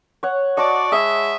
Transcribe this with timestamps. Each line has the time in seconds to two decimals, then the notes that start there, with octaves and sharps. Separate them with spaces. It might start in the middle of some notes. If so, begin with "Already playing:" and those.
0.23 C#5 F#5
0.57 F#4 D5 D#5 A5 C#6
0.92 G#3 E5 D#6 E6